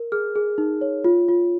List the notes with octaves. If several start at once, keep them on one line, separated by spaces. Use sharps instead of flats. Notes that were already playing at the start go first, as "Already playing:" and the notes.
Already playing: A#4
G#4 F6
G#4
D#4
C#5
F4
F4